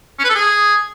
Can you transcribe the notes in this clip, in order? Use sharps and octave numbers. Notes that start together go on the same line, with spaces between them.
C#4
B4
A4
G#4